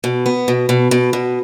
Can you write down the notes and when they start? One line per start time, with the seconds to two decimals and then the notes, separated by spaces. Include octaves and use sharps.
0.04 B2
0.26 B3
0.48 B2
0.69 B2
0.91 B2
1.13 B2